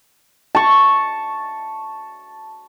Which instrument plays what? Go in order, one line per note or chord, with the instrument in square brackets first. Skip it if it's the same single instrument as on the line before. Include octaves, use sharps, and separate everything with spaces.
[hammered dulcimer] A5 C#6